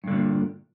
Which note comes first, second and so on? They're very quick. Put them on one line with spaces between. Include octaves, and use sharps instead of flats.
G2 D3 A#2